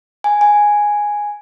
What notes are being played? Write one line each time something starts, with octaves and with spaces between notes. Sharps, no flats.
G#5
G#5